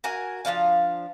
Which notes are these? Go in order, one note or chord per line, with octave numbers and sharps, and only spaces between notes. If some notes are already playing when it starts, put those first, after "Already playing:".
F#4 A#4 G#5
F3 B3 D4 F5